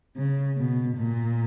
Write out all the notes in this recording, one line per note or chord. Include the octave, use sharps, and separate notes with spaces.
C#3
B2
A#2